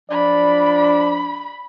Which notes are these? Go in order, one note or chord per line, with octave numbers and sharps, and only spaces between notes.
F3 D4 D5 B5